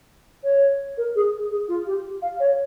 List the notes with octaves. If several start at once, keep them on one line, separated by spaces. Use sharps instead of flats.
C#5
A#4
G#4
G#4
F4
G4
F5
C#5